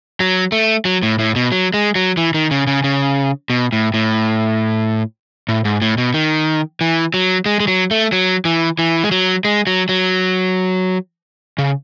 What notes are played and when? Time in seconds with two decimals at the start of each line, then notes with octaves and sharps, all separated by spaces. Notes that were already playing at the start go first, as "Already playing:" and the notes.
0.20 F#3
0.52 A3
0.85 F#3
1.03 A2
1.19 A2
1.36 B2
1.52 F#3
1.74 G#3
1.95 F#3
2.17 E3
2.34 D#3
2.51 C#3
2.67 C#3
2.84 C#3
3.50 B2
3.72 A2
3.94 A2
5.49 A2
5.65 G#2
5.82 A2
5.98 B2
6.14 D#3
6.81 E3
7.14 F#3
7.46 G#3
7.60 G#3
7.68 F#3
7.91 A3
8.12 F#3
8.45 E3
8.79 E3
9.04 G#3
9.12 F#3
9.45 G#3
9.67 F#3
9.89 F#3
11.58 C#3